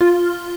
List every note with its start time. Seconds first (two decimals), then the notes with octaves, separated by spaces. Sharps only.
0.01 F4